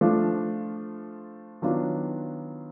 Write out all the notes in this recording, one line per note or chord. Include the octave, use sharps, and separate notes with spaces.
F3 A3 D4 F4
D#3 F#3 B3 D4 F4